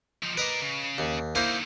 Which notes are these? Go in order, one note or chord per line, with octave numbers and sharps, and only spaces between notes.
F3 D#4
A#4 B4 D5 D#5
C#3
D#2
D3 A#3 D#4 E4 C5